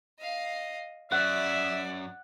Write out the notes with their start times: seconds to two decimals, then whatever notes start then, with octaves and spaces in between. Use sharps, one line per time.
0.20 D#5 F5
1.12 F#2 D5 E5 F#5